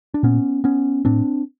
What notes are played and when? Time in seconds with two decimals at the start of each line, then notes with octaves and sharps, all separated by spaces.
0.14 D4
0.23 A#2 B3 C#4
0.64 B3 C#4
1.05 A2 C4 D4